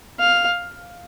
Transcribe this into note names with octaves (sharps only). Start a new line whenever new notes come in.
F5